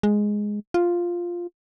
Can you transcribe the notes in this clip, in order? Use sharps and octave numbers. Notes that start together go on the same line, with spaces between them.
G#3
F4